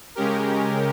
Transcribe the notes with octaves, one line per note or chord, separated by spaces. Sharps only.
C#3 G#3 C#4 G4 A#4